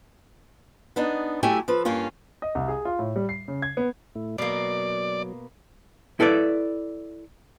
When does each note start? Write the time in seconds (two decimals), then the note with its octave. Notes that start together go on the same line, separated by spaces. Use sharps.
0.96 B3 D4 D#4
1.43 F#3 A3 E4 G4 E5 G#5
1.68 F3 A4 B4
1.85 G2 A#3 C#4 F4
2.42 D#5
2.55 C2
2.68 G#4
2.85 F4
2.99 A2
3.16 G3
3.29 C7
3.48 C#3
3.62 G#6
3.77 B3
4.15 A2 A3 E4
4.38 B2 F#3 A#3 D5
6.20 E4 A4 B4 D5